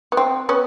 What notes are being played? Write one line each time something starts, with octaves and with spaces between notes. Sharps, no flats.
B3
C4
B3 C#4